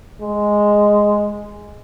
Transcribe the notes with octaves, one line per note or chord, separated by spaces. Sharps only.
G#3